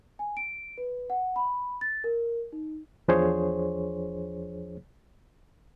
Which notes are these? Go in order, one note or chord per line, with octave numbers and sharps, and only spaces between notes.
G#5
D7
B4
F#5
B5
A6
A#4
D#4
E2 F3 D4 G#4 C5 C#5